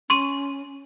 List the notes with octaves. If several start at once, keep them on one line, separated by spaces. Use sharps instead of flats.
C#4 C6 C#6 D#7